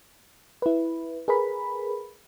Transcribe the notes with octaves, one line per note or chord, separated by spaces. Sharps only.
E4 B4
G#4 A#4 B4 B5